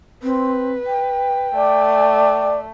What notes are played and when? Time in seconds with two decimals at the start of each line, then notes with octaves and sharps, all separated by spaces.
0.23 C4 B4
0.87 G5
1.55 A3 D5